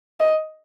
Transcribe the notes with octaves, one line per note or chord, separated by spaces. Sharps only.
D#5